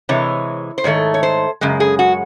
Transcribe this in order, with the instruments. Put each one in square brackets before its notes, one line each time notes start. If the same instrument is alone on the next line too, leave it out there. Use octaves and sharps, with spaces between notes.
[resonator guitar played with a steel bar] C3 E3 G#3 C#5
C5
G#2 D#3 A3 C#5
C#5
C5
F#2 C#3 G#3
G#4
F#4